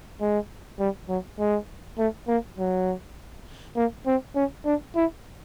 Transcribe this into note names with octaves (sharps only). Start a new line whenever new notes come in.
G#3
G3
F#3
G#3
A3
A#3
F#3
A#3
C4
C#4
D4
E4